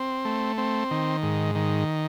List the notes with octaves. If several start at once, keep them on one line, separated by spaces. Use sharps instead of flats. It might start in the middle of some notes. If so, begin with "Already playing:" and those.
Already playing: C4
A3
C4
D#3
G#2
D#3